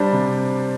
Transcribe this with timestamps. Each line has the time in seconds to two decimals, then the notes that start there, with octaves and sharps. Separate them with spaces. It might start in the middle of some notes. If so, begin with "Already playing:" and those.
Already playing: G3 D4 C5
0.12 C3